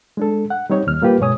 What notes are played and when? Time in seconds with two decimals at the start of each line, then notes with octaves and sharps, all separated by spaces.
0.17 G#3 D4 A4
0.50 F#5
0.70 G3 C4 D#4 C#5
0.87 D#2 F6
1.02 G3 A#3 F4 G4 B4
1.20 G2 B2 G#3 C#5 G#5 D#6